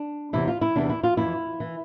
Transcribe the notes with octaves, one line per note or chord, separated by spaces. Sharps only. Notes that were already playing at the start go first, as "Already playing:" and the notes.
Already playing: D4
E2 C3 E3 E4
F4
E4
E2 C3 E3 D4
E4
F4
F2 E3 E4
E3